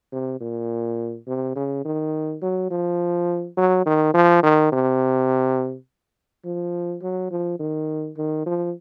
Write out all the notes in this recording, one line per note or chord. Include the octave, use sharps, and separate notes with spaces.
C3
A#2
C3
C#3
D#3
F#3
F3
F#3
D#3
F3
D#3
C3
F3
F#3
F3
D#3
D#3
F3